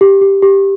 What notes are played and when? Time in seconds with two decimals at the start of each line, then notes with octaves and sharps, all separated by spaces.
0.01 G4
0.21 G4
0.42 G4